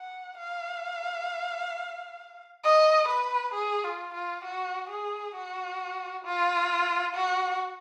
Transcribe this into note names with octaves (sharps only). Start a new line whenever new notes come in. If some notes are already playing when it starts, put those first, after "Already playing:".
Already playing: F#5
F5
D#5
B4
G#4
F4
F4
F#4
G#4
F#4
F4
F#4